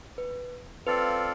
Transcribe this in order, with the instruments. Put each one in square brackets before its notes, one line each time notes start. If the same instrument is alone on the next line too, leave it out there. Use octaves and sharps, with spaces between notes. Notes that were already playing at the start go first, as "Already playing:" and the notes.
[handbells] B4
[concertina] C4 F4 A4 D5 F5 [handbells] B4